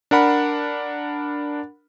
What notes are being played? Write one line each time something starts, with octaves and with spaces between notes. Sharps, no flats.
D4 A#4 F#5 B5